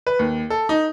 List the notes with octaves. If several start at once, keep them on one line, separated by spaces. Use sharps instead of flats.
B4
D#2
A4
D#4